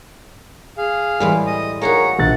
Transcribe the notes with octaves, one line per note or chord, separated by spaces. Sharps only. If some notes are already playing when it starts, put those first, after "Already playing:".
G#4 F5
A2 E3 G3 G#3
D#5 D#6
A#3 D#4 F#4 G#4 C#5 A#5
A#1 F#5 A6